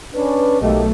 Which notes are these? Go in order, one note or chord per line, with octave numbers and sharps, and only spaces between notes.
C#4 D4 B4
B1 A3 A#3 G4 D#5